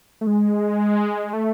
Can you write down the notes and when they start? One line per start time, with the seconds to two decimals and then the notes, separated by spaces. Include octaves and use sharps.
0.21 A3
0.27 G#3
1.33 A3